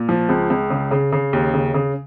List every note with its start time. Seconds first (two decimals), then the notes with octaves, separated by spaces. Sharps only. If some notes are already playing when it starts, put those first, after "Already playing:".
Already playing: A#2
0.09 F3
0.29 C#2
0.50 C#2
0.70 C#3
0.91 C#3
1.13 C#3
1.33 D#2
1.54 C#3
1.74 C#3